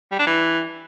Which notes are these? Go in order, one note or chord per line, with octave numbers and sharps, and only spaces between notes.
G3
D4
E3